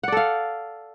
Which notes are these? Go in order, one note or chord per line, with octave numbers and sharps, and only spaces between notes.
A4 D5 F5 F#5